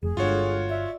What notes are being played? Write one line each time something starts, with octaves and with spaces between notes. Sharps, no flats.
F1 G#4
G1 G#3 D4 F4 F#4 A4 C#5
D5 E5